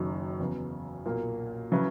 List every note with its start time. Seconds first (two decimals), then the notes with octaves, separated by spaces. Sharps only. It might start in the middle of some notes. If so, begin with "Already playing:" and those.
Already playing: F#1 F#2 D#3 F#3
0.39 E2 C#3 F#3 B3
1.05 B1 A#2 A#3
1.72 C#3 F#3 C#4 E4 B4